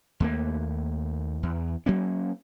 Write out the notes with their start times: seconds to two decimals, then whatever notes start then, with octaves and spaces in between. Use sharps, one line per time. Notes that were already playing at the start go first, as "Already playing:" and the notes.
0.20 D#2 A3 A#3
1.43 E2
1.86 F#3 A#3 C#4